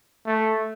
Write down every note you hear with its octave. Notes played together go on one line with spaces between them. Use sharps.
A3